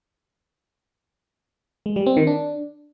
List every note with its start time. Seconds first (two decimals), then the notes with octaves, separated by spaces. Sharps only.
1.86 G#3
1.96 G3
2.06 C4
2.17 D#3
2.27 D4